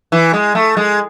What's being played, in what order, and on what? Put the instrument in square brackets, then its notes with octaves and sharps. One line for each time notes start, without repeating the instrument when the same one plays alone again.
[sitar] E3
G#3
A3
G#3